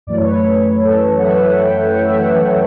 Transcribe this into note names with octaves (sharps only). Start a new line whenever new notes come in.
F#2 E3 A3 D5
C#5
B4
C#5
A4
A4
F#5
E5
F#5
F#5
G5
F#5
E5
F#5
F#5